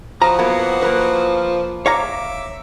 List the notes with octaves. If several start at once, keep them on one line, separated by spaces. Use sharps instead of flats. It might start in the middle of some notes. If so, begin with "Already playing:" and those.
E3 F3 F#4 A#5 D#6
F#3 A#3 B3
A#3 A#4 B4
C#5 E5 F5 A#5 D6